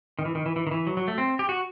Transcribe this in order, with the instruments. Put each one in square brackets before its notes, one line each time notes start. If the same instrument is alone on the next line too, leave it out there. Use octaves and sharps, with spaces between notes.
[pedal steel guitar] D#3
E3
D#3
E3
E3
D#3
E3
F#3
F#3
A3
C4
G4
F#4